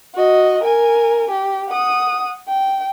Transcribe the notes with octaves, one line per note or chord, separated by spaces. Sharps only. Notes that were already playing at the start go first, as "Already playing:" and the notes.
F#4 D#5
A#4 G#5
G4
F#5 D#6
G5